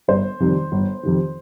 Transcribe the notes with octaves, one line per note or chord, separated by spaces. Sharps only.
G1 C5
F2 C3 D#3 G3
G1
F2 C3 D#3